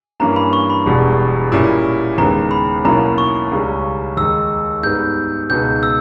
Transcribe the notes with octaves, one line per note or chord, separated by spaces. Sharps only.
G2 E3 A#3 C#4 A#5
B5
C#6
B5
E1 E2 B2 G3
A#2 G3 C#4 E4
D#2 C#3 G#3 B3 A#5
B5
B1 B2 A#3 C#4 E4 A#5
C#6
C#2 C#3 G3 C#4
D#2 D#3 G#3 D#4 E6
G#2 G3 B3 G6
C#2 B2 G#3 B3 D#4 G6
E6